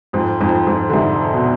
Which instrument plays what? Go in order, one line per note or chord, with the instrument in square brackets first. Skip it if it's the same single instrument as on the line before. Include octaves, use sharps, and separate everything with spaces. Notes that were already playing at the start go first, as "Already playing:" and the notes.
[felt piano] F2 G#2
F2 G#2
F2 G#2
D3
G#2 C3
B2